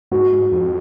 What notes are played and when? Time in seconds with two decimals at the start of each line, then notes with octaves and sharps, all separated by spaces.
0.11 G#2 F#4
0.32 G#2
0.52 F2